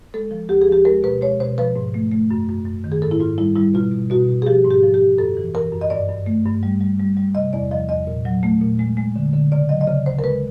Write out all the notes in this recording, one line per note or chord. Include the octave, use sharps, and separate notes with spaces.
G#3 A4
F3
D2 G4
G#4
F3 G4
G#3 A#4
B2 B4
G#3 C#5
B2 C5
F3 B4
G#2
A3
A3
F#2
F#2
F#2
D#3
G#4
G#2 A4
E4
G#2 F4
G3 E4
G3 E4
B2 F4
B2
B2 F#4
B2
G#4
F3 G4
G#2
G4
F3
G4
F3
F#2 A4
E3
E3 A#4
F#2
D#5
G2 D5
G2
A3
G2
G3
G3
G3
G3
C3 D#5
E2 D5
F3 D#5
E2 D#5
A#2
F#3
A3
A#2
G#3
G#3
D3
D3
C#3 D5
F#3 D#5
D#5
C#3 D5
D2 C5
A#4
G#3 B4